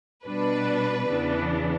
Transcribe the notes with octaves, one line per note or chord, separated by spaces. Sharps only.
B2 G3 D4 B4
E2 C#3 E3 B3 D4